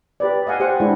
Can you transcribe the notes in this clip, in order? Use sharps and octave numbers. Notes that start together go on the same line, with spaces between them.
G4 B4 D5
D#5 F5 F#5 G#5
G4 C5 F#5
G#3 D4 E4